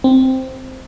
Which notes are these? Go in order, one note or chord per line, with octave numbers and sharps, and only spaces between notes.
C4